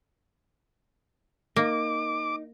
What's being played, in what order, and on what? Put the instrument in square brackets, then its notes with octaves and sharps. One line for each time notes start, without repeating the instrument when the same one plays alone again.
[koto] A#3 [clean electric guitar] D#4 [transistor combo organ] D6